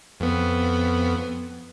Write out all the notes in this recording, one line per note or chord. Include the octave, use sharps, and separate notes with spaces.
F2 B3